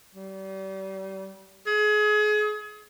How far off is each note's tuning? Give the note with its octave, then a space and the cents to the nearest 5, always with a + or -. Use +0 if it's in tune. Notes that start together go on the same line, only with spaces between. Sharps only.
G3 -35
G#4 +30